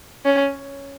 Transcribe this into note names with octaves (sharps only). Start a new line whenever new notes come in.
C#4